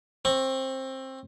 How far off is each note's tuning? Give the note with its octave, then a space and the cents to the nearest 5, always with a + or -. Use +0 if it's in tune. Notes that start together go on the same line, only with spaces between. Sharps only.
C4 +20 C#6 +0